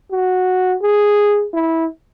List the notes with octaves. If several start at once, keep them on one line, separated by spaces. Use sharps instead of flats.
F#4
G#4
E4